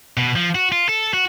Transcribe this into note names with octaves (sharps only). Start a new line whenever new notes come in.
B2
F3
F#4
F4
A4
F#4